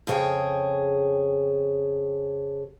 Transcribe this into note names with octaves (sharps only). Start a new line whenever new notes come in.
F2 C#3 G#4 C#5 G5